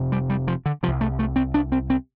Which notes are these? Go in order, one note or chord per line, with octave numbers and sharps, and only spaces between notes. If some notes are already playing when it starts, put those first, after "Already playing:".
Already playing: F1 F2 C3
G3
G3
F3
D3
C2 C3 F3
A3
A3
C4
D4
C4
C4